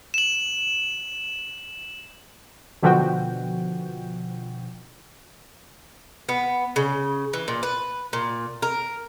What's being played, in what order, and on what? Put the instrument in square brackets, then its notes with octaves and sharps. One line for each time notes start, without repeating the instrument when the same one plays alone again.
[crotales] E7 F#7
[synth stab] B2 D3 F3 F#4 G5
[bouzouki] B3
C#3
E3
A#2
B4
A#2
A#4